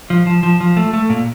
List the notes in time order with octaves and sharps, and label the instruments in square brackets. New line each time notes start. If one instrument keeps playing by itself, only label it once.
[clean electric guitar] F3
F3
F3
F3
A3
A3
A#2